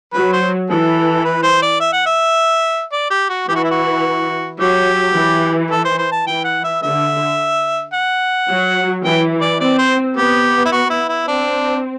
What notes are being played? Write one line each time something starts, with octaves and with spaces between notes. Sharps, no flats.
F#3 B4
C5
E3 A4
B4
C5
D5
E5
F#5
E5
D5
G4
F#4
E3 G4
F#4
E4
F#4
F#3 G4
E3
A4
C5
C5
A5
E3 G5
F#5
E5
D3 E5
F#5
F#3
E3 G5
D5
C4 D5
C5
B3 G4
E4
F#4
E4
E4
C4 D4